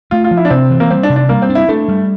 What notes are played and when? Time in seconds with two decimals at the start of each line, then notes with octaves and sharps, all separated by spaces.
0.11 A3 F4
0.24 F4
0.31 F3
0.37 E4
0.45 D4
0.50 C3 C4
0.70 E3
0.80 A#3
0.90 G3 C4
1.03 D4
1.10 C3
1.16 D4
1.29 G3 A#3
1.42 C4
1.49 D4
1.55 E4
1.69 A3 D4
1.88 G3